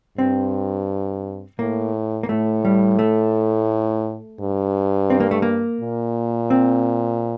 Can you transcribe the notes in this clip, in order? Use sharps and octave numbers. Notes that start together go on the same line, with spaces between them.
G2 C4
A2 A#3
A#3
A2 A3
G3
A3
G2
C4
A#3
A3
A#3
A#2
C4